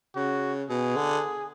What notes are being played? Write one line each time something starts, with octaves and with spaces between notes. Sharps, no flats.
C#3 F#4
B2 G#4
D3